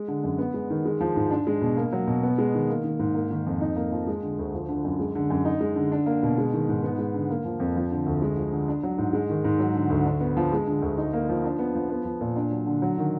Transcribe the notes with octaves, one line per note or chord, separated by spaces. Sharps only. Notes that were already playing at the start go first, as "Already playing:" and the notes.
Already playing: G#3
D3
F#2
B3
G#3
D#3
G#3
F3
G#2
D4
G#3
B2
A#3
F#3
B2
B3
G#3
D#3
A#3
D#3
G#2
A#3
D#3
F2
D#4
A#3
F3
G#3
D3
D2
F3
D3
F#2
G#3
D3
F#2
D#4
G#3
D3
D4
A#3
B2
G#3
D#3
G#2
B3
G#3
D3
A#3
F3
F2
F3
D3
D2
G#3
F3
D3
D4
F#3
G#2
G#3
D#3
G#2
F#3
D3
D2
D4
B3
F3
G#3
D3
D2
D#4
A#3
F3
D4
B3
F3
B3
F3
A#2
D4
F#3
D3
F#3
D#3